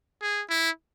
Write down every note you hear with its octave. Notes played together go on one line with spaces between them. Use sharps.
G#4
E4